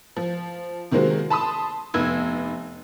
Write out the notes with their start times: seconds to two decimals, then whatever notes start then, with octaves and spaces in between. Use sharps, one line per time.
0.16 F3
0.91 C3 D#3 G#3 A#3 C4 F#4
1.30 A5 B5 C6 D#6
1.94 F1 B3 D#4 E6 G#6